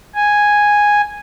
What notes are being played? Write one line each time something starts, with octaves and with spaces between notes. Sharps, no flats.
G#5